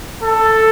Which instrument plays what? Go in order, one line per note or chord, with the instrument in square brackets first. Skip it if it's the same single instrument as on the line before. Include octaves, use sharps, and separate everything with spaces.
[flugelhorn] A4